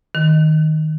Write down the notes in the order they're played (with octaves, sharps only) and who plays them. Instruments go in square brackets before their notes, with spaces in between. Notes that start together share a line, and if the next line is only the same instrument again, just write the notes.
[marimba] D#3